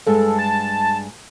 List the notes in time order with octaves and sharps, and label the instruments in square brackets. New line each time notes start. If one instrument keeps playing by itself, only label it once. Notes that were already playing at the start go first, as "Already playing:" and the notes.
[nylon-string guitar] G2 G#3 [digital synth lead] A4
[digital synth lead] A5